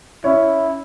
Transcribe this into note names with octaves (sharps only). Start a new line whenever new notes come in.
C#4 E4 C#5